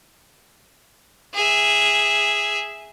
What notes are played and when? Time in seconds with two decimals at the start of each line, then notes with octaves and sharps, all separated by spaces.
1.34 G#4 E5